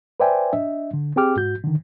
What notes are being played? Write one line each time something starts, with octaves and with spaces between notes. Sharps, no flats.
B4 C5 D5 E5 G5 G#5
D4 D#5 E5
D3
C4 G4 G#4 G5 D6 F6
G#2 F#4 G6
D3 D#3